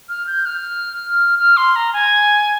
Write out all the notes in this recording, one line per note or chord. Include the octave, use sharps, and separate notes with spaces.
F6
G6
F6
F6
C6
A#5
G#5